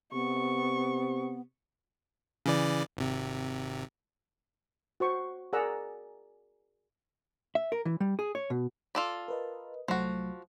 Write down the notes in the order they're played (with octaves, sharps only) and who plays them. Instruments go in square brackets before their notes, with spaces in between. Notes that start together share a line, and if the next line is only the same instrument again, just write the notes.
[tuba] C3 [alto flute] B3 [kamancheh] C#6
[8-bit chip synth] C#3 E3 D5
G#1 C3
[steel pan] F#4 C5 C#6
G#4 A#4 D5 F#5 A#5 E6
[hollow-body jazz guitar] E5
A#4
E3
G3
G#4
C#5
B2
[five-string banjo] F4 A4 D5
[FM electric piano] A#4 B4 D#5
[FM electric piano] C2 F#3 A3 [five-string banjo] F3 F#4